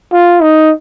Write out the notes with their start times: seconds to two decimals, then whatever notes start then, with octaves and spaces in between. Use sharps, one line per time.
0.12 F4
0.41 D#4